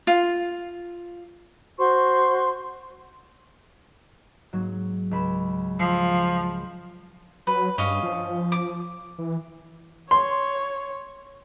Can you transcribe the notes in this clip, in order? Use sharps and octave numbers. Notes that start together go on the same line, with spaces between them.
F4
F#4 C5 C6 C#6
G#2 F#3 A#3
C#2 B5 E7
F3 E6
F#3 B4
G2 C#4 D#5 F5
F3
D6
E3
C#5 C6